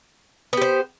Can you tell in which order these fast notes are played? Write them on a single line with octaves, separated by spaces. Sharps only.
B3 G4 C5